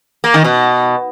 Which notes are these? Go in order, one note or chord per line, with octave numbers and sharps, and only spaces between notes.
A#3
D#3
B2